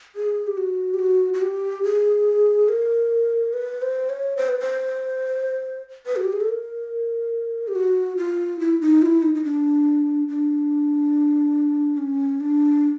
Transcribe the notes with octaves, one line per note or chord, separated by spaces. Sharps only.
G#4
G4
F#4
G4
F#4
F#4
G4
G#4
A#4
B4
C5
C#5
C5
B4
C5
B4
F#4
G4
G#4
A4
A#4
G4
F#4
F4
E4
D#4
F4
E4
D#4
D#4
D4
D4
C#4
D4